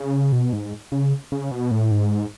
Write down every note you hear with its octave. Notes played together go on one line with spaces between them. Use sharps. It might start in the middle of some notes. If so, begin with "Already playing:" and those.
Already playing: C#3
B2
G#2
C#3
C#3
B2
A2
G#2